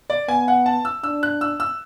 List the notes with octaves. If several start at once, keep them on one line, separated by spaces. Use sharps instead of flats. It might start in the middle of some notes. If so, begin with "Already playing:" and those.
D5
B3 G#5
F#5
A5
E6
D4 E6
F#6
E6
E6